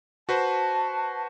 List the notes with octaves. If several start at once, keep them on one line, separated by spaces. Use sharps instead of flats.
F#4 B4 C5 A5